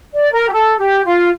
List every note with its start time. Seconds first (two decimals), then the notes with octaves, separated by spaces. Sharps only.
0.14 D5
0.32 A#4
0.48 G4
0.52 A4
0.79 G4
1.05 F4